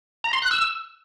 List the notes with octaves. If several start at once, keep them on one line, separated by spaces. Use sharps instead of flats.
A#5
C6
F#6
E6